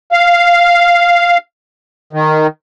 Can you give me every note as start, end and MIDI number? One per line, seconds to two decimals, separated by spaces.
0.12 1.37 77
2.13 2.47 51